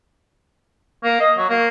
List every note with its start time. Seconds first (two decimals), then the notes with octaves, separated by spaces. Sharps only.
1.04 A#3
1.21 D#5
1.38 F#3
1.50 A#3